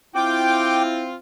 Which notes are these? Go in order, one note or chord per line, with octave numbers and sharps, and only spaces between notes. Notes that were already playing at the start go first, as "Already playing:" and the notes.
C4 E4 F4 G5 D6